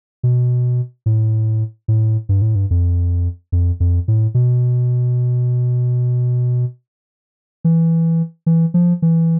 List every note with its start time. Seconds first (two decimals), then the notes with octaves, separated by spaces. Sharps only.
0.23 B2
1.06 A2
1.88 A2
2.29 G2
2.42 A2
2.55 G2
2.71 F2
3.52 F2
3.80 F2
4.08 A2
4.34 B2
7.65 E3
8.46 E3
8.74 F3
9.02 E3